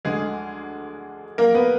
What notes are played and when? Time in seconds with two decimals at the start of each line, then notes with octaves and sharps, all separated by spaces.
0.05 D2 D3 G#3 G#4
1.38 A#3 A#4
1.55 B3 B4